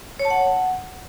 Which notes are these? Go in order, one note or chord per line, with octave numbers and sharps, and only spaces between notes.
C#5
A5
F#5